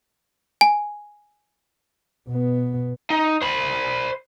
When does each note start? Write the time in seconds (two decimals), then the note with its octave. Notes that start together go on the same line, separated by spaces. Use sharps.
0.61 G#5
2.28 B2 B3
3.10 D#4
3.42 C5 B5